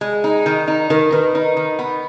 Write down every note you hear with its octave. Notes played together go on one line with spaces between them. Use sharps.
G#3
D#4
D#3
D#4
D#3 A#4
D#3 B4
D#4
D#3
B3